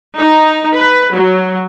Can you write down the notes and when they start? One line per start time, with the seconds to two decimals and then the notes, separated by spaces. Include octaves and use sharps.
0.16 D#4
0.78 B4
1.16 F#3